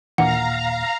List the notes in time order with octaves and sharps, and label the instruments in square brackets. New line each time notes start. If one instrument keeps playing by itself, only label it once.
[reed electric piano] D#2 A#2 [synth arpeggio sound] E3 D4 A#4 [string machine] F5 A#5 [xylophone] F#5